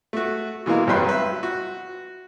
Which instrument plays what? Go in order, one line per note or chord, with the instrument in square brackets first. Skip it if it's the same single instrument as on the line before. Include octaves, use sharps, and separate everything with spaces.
[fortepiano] A3 F#4
B2 E3 G#3 A#3
G#1 G2 F#3 B4 G5 C6
B4 E5
F#4